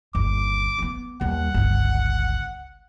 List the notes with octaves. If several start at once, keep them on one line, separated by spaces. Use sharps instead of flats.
G1 D#2 D6
B3 C4
D#2 G3 F#5
G1 C#2